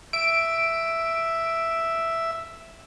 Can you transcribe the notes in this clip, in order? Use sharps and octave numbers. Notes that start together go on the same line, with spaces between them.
E5 D7